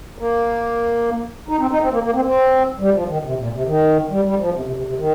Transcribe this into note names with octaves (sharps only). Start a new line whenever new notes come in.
A#3
D#4
C4
D#4
C4
A#3
A#3
C4
C4
G3
F3
D#3
C3
A#2
C3
D#3
G3
G3
F3
C3
C3
C3
C3
D#3